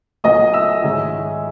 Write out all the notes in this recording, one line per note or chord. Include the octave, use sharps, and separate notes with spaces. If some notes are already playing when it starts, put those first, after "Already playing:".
B1 A#2 F#3 A#3 C#4 D#5 D#6
E5 E6
G#2 D#3 G#3 C#4